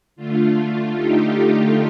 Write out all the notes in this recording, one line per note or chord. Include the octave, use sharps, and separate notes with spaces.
D3 A3 F4
D#4 G4